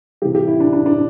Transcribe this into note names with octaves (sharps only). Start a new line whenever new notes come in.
C3 E3 G3 G4
G4
E4
D4
D4
D4